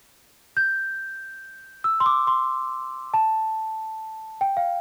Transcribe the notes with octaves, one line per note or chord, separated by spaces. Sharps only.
G6
E6
C6
D6
C6
A5
G5
F5